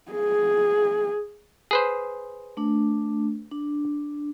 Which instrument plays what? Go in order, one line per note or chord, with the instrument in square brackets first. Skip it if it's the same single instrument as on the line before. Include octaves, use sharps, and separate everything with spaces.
[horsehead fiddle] G#4
[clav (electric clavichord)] G#4 B4 C5
[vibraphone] A3 D4
D4